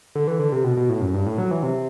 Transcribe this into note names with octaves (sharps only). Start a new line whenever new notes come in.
D3
E3
D3
C3
B2
B2
A2
F#2
G2
A2
F#3
E3
C3